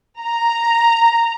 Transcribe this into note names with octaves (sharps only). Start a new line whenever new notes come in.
A#5